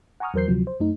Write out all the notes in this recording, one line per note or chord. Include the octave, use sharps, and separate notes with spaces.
F#5 G#5 A#5 C#6 D#6 F6
E2 F#3 A#4 C5 G6 C7
D2 C3 F3 F#3
C5
F#2 A3 D#4